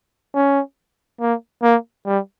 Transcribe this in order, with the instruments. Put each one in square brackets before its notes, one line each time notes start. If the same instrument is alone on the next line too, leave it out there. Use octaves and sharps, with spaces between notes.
[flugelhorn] C#4
A#3
A#3
G3